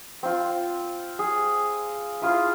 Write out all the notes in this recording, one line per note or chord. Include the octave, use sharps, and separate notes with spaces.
C4 F4
G#4
E4 F4 G#4 F5